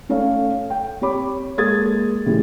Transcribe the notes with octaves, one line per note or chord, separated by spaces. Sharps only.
A3 C#4 A4 C#5 F5
G5
C4 G4 C#5 B5 D6
G#3 A#3 A4 D#6 G#6 A6
A2 C#3 E3 G#3 G4